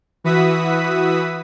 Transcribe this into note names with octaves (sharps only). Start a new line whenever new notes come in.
E3 F#4 B4 E5 D#6 B6